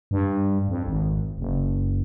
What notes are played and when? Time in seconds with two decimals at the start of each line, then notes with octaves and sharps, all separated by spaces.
0.11 G2
0.69 F2
0.87 G#1
1.38 F#1